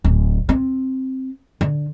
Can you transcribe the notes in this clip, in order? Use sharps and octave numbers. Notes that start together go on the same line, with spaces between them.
D1
C4
D3